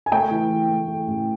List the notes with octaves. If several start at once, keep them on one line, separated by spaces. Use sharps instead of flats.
G#5
A3 G5
E3
E3
A3
A3
A1